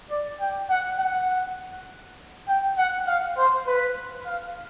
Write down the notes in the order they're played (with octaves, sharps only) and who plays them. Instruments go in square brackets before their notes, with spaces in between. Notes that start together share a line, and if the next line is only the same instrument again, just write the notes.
[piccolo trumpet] D5
G5
F#5
F#5
G5
F#5
F5
C5
B4
F5